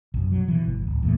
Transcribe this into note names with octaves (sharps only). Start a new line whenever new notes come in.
B1 F#2
F#3
B2 E3
G1
D1
E2 A#2 A3